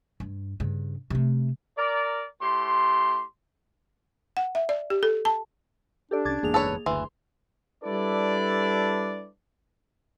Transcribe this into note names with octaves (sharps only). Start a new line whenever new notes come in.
G2
G2 C#3
C3 A3
A#4 D5
A2 G4 C6
F#5
E5
D5
G4
A4
A5
D4 G4 A4 D5
C2 C#4 D6 G#6 A6
F#1 E2 G#2 A#3 G#4 F7
A4 B4 C#5
F#1 D2 E3 C6
G3 D4 E4 A4 B4 D5